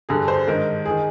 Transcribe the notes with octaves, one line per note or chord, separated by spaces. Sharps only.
G2 D3 G#4
C5
G#2 D#3 A#4
D#3 G#4